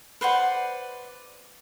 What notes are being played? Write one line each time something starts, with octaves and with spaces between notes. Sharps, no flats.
B4 C5 D5 F#5